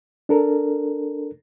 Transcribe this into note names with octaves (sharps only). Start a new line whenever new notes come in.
D4 A4 A#4